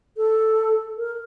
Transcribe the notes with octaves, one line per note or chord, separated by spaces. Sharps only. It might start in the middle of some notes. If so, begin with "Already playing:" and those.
A4
A#4